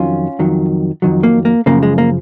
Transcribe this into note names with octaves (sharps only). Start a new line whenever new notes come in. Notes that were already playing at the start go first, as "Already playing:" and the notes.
Already playing: F2 D#3 F#3 C#4 F4
F2 D#3 F#3
F2 D#3 F#3
A#3
A#3
F#2 C#3 F3 A#3
G#3
A#3